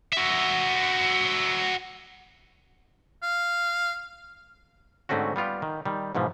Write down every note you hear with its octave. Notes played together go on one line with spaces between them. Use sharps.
F#4 E5
F5
G#2 D3 A3 C4 C#4 F#4
G3 B3 F4 G4
D#3
D#3 G3
G#2 B2 E3 F3